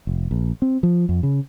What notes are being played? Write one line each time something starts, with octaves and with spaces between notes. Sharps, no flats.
F1
A#1
C4
F3
F2
C#3